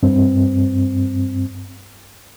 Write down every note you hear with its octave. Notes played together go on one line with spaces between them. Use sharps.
G2 C4